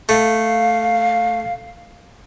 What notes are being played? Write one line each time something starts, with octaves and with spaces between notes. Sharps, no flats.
A3 F5